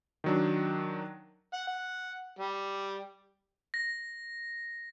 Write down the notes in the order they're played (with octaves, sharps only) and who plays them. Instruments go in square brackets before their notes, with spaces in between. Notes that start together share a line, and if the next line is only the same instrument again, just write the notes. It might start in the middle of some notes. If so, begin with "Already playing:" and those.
[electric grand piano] D#3 F#3 D4
[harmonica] F#5
F#5
G3
[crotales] A#6